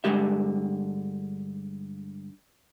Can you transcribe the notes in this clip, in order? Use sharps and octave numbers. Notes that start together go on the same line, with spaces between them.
G2 D3 F#3 G#3 G4 E5